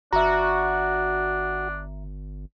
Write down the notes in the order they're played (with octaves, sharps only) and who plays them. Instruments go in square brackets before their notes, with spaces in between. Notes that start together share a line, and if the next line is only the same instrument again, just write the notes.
[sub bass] G1 [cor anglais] D4 [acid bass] F#4 [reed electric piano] E5 A#5